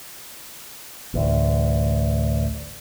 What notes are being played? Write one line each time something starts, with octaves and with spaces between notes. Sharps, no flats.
A1 D2